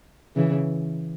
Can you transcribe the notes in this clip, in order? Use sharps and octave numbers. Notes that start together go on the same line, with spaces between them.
C#3 E3